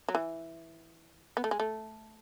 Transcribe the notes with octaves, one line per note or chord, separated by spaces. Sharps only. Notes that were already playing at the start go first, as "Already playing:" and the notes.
F#3
E3
B3
A3
G#3
A3